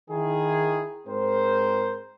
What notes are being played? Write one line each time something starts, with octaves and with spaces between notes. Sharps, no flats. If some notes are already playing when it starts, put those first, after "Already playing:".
D#3 E4 G#4
G#2 C4 A#4 C5